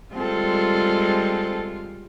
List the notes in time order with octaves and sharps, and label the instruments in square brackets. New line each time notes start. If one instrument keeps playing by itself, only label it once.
[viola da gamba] G3 G#3 F4 [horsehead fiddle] C4 A4